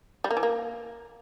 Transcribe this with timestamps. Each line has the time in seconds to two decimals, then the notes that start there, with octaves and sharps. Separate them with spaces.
0.24 G3
0.31 A#3
0.37 E3
0.43 A#3